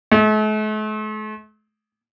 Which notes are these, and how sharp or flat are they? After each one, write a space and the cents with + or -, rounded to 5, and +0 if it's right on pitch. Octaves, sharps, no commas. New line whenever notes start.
A3 -45